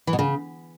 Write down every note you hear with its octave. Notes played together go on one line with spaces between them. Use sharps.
E3
B2
C#3